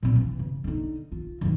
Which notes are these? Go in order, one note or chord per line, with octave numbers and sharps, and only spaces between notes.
A#2 C4
E3
C#3
D3 D#4
F4
D3 D#3